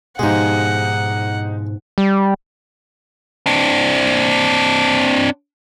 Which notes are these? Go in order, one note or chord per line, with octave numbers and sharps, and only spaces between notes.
G#2 B2 F3 G#3 D#4 G4 G#4 F#5
G3
C4 D4